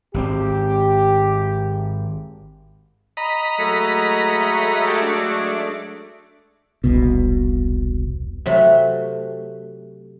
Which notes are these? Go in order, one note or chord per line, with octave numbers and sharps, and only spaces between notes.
G#1 D#3 C4 G4
D#5 A#5 B5
F#3 G#3 A3
G4 A4
D4
E1 C2 B2
C3 F#3 A3